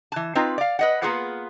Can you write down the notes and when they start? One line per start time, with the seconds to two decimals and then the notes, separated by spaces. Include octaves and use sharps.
0.12 E3 A5
0.35 C4 D#4 F4 B4
0.58 D5 F5
0.79 B4 D#5 F#5
1.02 A#3 B3 F4 G#4 B4 F#5